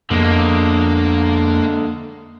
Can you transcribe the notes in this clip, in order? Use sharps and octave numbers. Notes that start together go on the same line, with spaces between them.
F2 D3 G#3 A#3 B3